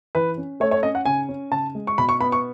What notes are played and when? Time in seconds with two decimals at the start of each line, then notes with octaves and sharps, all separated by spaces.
0.15 E3 B4
0.37 C#4
0.60 A3 C#5
0.71 C#5
0.83 C#4 D#5
0.95 F#5
1.05 C#3 G#5
1.29 C#4
1.51 C#3 A5
1.75 G#3
1.87 C#6
1.98 B2 B5
2.09 C#6
2.21 B3 B5
2.32 C#6